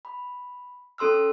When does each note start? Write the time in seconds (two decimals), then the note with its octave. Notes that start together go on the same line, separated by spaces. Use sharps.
0.05 B5
0.98 C#4 A4 C6 E6 F6